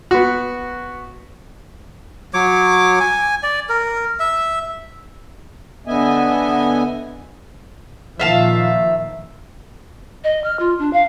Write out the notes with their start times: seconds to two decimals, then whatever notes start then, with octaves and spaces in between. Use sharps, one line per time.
0.11 B3 F#4
2.34 F#3 C#5 D6
3.00 G#5
3.43 D5
3.69 A#4
4.20 E5
5.87 D3 B3 D#5 E5 G#5
8.20 A#2 D#3 F3 E5 F5 A5
10.24 D#5
10.44 F6
10.59 F4
10.79 D4
10.93 F5